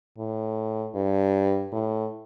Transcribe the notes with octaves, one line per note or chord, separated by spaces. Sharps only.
A2
G2
A2